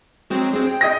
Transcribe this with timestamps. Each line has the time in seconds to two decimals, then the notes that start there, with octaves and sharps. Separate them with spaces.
0.30 F#3 G#3 C4
0.53 G#3 C4 G#4
0.67 G5
0.81 D#5 D#6 A#6